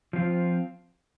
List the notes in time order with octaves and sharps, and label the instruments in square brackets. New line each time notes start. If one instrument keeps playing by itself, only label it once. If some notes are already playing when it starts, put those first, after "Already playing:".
[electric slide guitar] F3 C4 F4